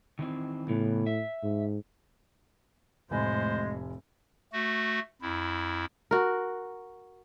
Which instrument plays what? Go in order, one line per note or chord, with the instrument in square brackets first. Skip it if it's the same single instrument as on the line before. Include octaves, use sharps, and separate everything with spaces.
[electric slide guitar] D#3 E3 C4
[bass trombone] A2 [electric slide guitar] C#3 E3 B3
[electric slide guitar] E5
[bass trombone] G#2
[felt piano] F1 G#5 B5 [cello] A2 [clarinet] G#3 [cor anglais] C5
[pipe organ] A3 F#4
F2 E4
[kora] F#4 A#4